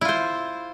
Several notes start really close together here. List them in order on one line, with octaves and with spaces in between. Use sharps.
E4 F4 C5